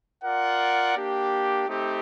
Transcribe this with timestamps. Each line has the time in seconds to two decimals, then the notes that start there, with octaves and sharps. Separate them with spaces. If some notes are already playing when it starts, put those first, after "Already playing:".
0.24 F4 A#4 D5 F#5
0.96 A#3 D4 G4
1.68 A3 C4 D#4 G4